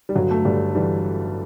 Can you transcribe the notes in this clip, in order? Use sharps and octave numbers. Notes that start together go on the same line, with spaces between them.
G3
G1 F#3
A3
G1 G3
E3 G3